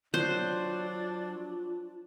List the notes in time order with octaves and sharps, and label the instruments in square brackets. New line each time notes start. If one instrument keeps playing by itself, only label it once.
[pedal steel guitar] F#3 F#6 [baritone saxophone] D4 [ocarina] F4 [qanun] C5